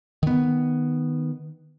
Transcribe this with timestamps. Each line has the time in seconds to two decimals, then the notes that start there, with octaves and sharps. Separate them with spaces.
0.23 D#3 B3